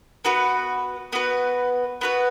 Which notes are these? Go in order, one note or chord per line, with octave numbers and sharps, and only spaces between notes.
B3 F#4 B4
B3 F#4 B4
B3 F#4 B4